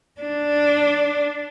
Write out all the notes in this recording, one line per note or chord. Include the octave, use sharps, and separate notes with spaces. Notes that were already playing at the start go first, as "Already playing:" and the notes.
D4